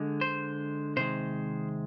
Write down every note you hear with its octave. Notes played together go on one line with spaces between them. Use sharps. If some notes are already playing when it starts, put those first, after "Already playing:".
Already playing: D3 G#3
C5
C3 D#3 G#3 C5